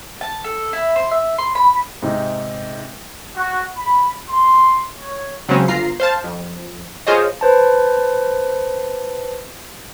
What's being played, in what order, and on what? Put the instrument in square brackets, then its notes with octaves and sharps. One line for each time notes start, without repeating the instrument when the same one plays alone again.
[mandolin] A5
A4
E4
C5
E5
C6
B5
[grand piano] G#2 C3 D#4
[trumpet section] F#4
B5
C6
C#5
[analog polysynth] C#3 F#3 G#3 C4 C#4
G1 F4 A#5 C7
C5 F5 A5
F2
F4 G#4 C5 C#5 D#5
[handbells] B4 C5 A5